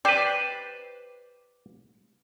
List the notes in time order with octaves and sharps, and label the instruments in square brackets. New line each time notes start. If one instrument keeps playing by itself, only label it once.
[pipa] G4 D5 [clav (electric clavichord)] B4 C5